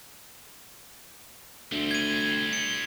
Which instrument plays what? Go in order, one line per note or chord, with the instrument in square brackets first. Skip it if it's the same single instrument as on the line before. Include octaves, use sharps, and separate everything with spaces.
[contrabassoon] D2 [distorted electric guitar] G3 C4
[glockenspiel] G#6 D#7
C#7